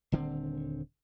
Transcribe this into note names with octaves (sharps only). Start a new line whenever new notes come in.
D#1 D3 C4